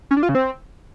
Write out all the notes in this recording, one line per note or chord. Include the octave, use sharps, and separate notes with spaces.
C#4
D4
F4
C#3
C4